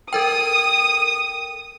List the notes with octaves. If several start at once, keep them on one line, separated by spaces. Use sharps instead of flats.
A4 A#4 G5 D#6